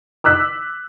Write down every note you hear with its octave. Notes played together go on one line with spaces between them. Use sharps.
D6 E6 F#6 B6